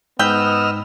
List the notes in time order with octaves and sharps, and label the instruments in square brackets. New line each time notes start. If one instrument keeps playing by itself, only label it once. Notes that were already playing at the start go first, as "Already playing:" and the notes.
[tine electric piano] G#2 B5 G6 [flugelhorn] B3 [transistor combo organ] D#5 E6 F6 [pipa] G5